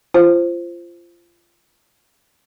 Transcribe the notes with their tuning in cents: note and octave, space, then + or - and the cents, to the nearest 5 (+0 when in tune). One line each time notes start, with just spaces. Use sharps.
F4 -25 C5 +0